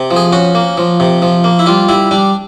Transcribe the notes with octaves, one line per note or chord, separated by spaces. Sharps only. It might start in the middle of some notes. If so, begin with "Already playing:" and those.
Already playing: C3
F3
G#4
C#4 F#4
A#3
F3
C3
F3
A#3
E4
G3 F4
G3 E4
G3 D4